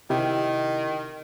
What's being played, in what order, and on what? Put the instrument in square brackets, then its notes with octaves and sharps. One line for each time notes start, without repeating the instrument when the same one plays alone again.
[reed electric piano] C3 E4 G4 [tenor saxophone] D#3